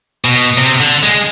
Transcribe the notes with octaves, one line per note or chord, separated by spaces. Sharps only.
B2
C3
D3
G#3